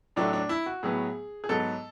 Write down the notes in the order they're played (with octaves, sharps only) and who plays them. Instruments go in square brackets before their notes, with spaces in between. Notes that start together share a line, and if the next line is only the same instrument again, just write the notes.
[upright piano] A2 F#3 A3 D4
D4
E4
F#4
A2 F#3 B3 G#4
G#4
G#2 F#3 B3 A4